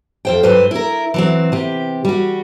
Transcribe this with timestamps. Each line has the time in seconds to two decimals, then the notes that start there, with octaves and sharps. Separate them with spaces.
0.25 F2 C5 G5
0.43 G2 F#3 B4 C5
0.71 E4 A#4
1.14 E3 F#3 C4
1.52 C3 G4
2.05 G3 F#4